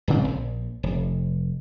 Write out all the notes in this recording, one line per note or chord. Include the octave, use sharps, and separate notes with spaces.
D1 G#1 C#3 C4
A#1
F1